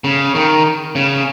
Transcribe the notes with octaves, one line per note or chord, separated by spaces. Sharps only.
C#3
D#3
C#3